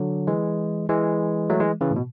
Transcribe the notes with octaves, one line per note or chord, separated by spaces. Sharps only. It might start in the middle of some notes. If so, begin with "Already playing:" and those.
Already playing: D3 F#3
E3 G#3
E3 G#3
F#3 A3
E3 G#3
C#3 E3
A2
B2